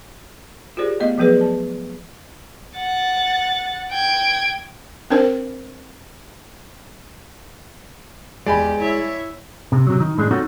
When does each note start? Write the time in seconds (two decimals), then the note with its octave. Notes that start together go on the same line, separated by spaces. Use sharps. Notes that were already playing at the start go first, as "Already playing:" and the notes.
0.77 F4 G4 G#4 A#4 C5 D5
1.00 A3 B3 D#5
1.18 F3 F#3 B3 G#4 B4 D5
1.41 A5
2.76 F#5 A6
3.92 G5 G#6
5.11 C4 D4 A#4 C5
8.46 E2 G#3 G4 D5 G#5 B5
8.80 E4 C#5 E5
9.72 C3
9.87 C3 F#3
10.00 D#3
10.18 A2 G#3 D4
10.31 C4 D#4 F4 F#4 A4 C#5